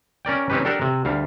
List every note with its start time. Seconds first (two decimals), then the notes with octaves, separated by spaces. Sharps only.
0.25 C#4 A#4 D5 G5
0.50 C4 C#4 D#4 G4 B4
0.65 D4 G4 A4 A#4 F#5
0.81 C3
1.05 D2 G3 F5